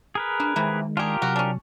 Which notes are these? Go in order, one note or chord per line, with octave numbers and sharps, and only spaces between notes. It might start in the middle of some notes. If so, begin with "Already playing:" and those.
G#4 A#4 B4
A#3 D4
C3 D#3 E3 G#3 A#3
D4 F4 G4 G#4 A#4
C3 F#3 F#4
C#4 D4